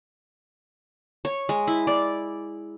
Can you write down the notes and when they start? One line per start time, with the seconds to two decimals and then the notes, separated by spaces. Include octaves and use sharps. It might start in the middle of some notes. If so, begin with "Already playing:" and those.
1.25 C#5
1.49 G#3
1.68 E4
1.87 D5